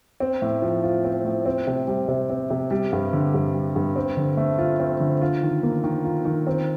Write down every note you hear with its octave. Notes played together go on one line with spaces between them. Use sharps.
C4
A2
F3
F4
C4
A2
C4
C3
G3
C3
C4
C3
G3
G2
D3
G2
G3
G2
C4
D3
A3
F4
C4
D3
F4
D#3
A#3
D#3
F4
D#3
C4